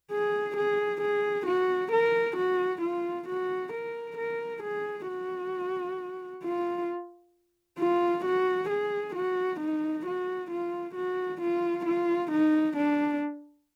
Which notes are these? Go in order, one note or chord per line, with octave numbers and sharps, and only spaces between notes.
G#4
G#4
G#4
F#4
A#4
F#4
F4
F#4
A#4
A#4
G#4
F#4
F4
F4
F#4
G#4
F#4
D#4
F#4
F4
F#4
F4
F4
D#4
D4